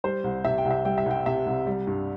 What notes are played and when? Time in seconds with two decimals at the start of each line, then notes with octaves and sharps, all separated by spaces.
0.04 G3 C5
0.24 C2
0.45 C3 E5
0.58 G5
0.65 C2
0.70 E5
0.85 G3 G5
0.98 E5
1.06 C2
1.11 G5
1.26 C3 E5
1.46 C2
1.67 G3
1.87 G2